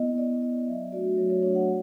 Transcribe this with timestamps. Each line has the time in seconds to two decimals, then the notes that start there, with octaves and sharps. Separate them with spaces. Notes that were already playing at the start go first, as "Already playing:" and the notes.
Already playing: B3 E4 D#5
0.18 B3 D5
0.42 E4 D#5
0.67 F#3 E5
0.92 A3 D4 F#4 D5
1.17 F#3 C#5
1.30 C#5
1.42 A3 D4 F#4 C#5
1.55 F#5